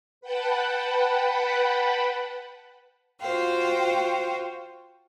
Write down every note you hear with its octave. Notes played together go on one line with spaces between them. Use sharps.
B4 F#5 G5 A5 B5
F4 F#4 C5 F5 G5